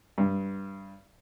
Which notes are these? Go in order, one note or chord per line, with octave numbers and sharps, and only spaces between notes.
G2